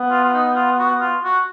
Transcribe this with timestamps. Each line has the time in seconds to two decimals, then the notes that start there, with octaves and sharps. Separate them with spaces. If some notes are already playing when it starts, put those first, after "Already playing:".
Already playing: B3
0.11 F4
0.24 F4
0.34 D#4
0.56 F4
0.79 F#4
1.00 F4
1.24 F#4